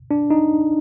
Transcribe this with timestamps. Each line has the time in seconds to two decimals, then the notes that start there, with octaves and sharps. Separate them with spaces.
0.11 D4
0.30 D#4